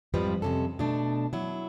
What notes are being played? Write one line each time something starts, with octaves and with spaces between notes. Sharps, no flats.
F2 G#2 F3 G3 B4
F2 G#2 C3 C#4 A4
B2 A3 D4
F#3 E4